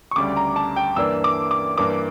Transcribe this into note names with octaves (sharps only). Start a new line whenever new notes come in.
C#6
D2 C#3 G3 D6
A#5
A5
G5
G2 E3 A#3 D4 E6
D6
D6
G2 E3 A#3 D6